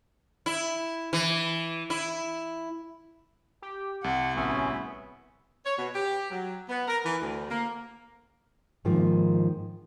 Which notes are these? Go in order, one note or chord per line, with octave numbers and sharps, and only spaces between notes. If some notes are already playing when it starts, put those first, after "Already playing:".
E4
E3
E4
G4 G5
C2 F#5 A5
A1 B3 C#4 F#4 G#4 E5 G#5
C#5
B2
G4
F#3
B3
A#4
E3
D2
A#3
G#2 D#3 F3 A#3